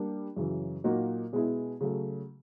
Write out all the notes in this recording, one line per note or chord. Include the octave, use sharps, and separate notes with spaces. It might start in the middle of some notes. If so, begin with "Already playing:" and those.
Already playing: G3 A#3 D4
F#2 C#3 E3
A#2 F#3 A#3 D#4 F#4
B2 G#3 B3 E4 G#4
C#3 F#3 A3